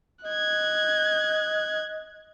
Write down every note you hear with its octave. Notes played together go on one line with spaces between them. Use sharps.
D#5 F#6 G#6